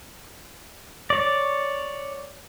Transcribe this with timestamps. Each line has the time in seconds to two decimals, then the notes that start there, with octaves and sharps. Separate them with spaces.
1.10 C#5 D5